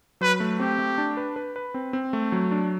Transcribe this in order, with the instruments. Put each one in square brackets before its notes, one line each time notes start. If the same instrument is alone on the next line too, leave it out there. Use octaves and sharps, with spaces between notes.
[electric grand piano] F#3 [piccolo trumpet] B4
[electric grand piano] A3
[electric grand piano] C4 [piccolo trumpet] G4
[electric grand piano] A3
D4
B4
B4
B4
C4
C4
A3
F#3
D4